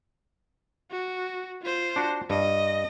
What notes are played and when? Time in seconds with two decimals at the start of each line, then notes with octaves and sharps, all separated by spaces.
0.91 F#4
1.62 F4 C5
1.96 D4 F#4
2.30 G2 D#5